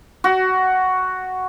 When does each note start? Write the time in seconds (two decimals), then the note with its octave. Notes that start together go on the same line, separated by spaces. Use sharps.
0.24 F#4